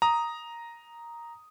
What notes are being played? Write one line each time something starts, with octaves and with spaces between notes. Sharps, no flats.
A#5 D#6